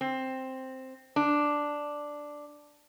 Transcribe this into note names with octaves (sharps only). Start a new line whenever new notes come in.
C4
D4